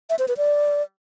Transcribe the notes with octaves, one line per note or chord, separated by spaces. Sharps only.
E5
C5
B4
D5